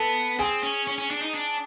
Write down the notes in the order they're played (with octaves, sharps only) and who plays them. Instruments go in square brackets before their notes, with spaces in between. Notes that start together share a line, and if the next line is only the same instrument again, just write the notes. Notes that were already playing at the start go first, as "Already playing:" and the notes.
Already playing: [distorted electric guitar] B3 [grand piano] A4 A5
[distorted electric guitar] C4 [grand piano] G#4 G#5
[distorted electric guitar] C#4
C#4
C#4
D4
D#4
D4